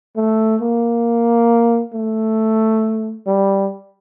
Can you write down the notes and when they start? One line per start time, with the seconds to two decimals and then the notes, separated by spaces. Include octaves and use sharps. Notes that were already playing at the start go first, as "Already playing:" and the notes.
0.17 A3
0.61 A#3
1.94 A3
3.27 G3